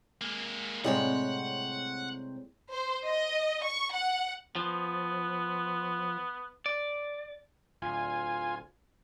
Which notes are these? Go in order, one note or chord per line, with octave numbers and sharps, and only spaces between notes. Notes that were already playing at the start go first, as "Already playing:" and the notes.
G#3 A#3
A2 C3 G3 G#3 C4 C#5 F#5
C5
D#5
C#6
F#5
F3 B3
D5
D1 F4 G#5